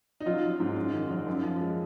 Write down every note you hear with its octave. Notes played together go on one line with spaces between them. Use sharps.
D#4
F#3 F4
F#3
G#2
F#2
D#3
F#3
F#2
F3
G#3